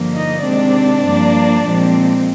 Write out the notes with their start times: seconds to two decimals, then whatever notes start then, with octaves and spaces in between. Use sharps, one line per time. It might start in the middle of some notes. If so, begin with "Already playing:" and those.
Already playing: G2 D3 F3 A#3
0.14 D#4 D#5
0.44 C3 D#3 G#3 C4 D4 D5
1.05 G2 F3 A#3
1.65 A#2 F3 G#3 C4